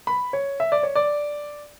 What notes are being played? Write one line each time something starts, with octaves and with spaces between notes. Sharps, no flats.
B5
C#5
E5
D5
C#5
D5